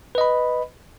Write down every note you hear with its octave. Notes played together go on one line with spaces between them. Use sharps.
B4 D#5 B5